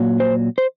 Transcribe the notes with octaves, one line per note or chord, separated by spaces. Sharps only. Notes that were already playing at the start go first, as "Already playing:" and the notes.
Already playing: A#2 F#3
C5
C5